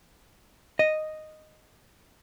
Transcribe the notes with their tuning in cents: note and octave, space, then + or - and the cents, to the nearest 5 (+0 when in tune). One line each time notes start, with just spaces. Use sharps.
D#5 -5